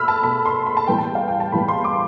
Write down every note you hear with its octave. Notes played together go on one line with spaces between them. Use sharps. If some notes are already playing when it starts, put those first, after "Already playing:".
Already playing: B2 A3 B5 E6 F6
A5
B2 A3 B5
C6
B5
A5
A2 E3 G3 B3 G5
A5
F5
G5
A5
A2 E3 G3 B3 B5
C6
D6